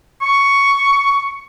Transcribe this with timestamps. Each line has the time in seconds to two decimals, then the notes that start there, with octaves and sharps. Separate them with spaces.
0.22 C#6